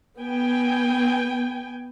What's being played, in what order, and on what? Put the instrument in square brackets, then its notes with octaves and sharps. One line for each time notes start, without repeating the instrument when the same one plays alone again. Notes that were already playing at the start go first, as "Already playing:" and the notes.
[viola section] B3 G5 G#5